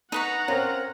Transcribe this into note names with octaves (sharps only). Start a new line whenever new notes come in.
D#4 B4 F#5 A#5 C#6
C4 C#4 F4 A#4